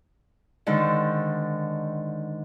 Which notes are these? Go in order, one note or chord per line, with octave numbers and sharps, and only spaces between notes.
G#2 D3 D#3